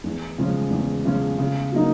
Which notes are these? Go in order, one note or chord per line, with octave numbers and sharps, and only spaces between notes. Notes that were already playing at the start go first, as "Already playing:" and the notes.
E2
C#3 F3 G#3 C#4
E2
C#3 F3 G#3 C#4
C#3
F#3 A#3 D#4